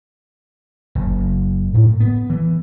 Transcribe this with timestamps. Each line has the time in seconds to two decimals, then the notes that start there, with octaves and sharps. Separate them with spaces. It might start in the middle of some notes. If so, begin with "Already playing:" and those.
0.95 F#1
1.74 A2
2.00 B3
2.30 E3